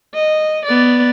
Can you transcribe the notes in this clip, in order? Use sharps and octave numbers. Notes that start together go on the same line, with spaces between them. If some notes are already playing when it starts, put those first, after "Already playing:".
D#5
B3 D5